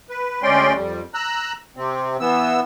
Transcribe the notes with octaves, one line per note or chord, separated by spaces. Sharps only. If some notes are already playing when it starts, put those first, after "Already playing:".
B4
D2 G#3 C#4 D5 G5 C6
F2 G3
A#5 E6 F#6
C3 C4
E3 B3 E6